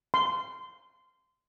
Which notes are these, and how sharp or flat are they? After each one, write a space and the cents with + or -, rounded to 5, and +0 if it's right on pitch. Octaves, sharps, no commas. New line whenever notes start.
C6 -20